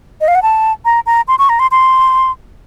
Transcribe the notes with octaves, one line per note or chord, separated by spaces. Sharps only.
D#5
F5
F#5
A5
A#5
A#5
C6
C#6
A#5
C6
C6